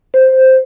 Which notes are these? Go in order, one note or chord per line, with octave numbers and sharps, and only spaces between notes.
C5